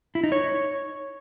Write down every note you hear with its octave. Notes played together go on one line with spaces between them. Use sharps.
E4
D#4
C#5